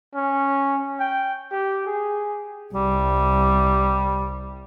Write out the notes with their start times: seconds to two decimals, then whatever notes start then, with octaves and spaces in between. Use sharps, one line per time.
0.15 C#4
1.00 G5
1.52 G4
1.87 G#4
2.74 C2 G3